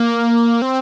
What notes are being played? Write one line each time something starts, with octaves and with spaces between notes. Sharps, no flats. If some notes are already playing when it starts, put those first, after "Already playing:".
Already playing: A#3
C4